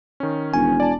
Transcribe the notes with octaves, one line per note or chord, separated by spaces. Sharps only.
D#3 C#4
E1 G#5
D5 A5